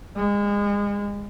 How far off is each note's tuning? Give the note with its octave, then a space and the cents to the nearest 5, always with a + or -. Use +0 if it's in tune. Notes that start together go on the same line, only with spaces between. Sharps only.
G#3 -30